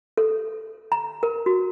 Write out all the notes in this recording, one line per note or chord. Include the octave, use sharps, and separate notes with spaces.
A4
A#5
A#4
F#4